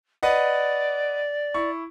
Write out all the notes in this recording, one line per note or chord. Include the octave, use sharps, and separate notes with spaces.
B4 D5 D#5 F#5
E4 C#6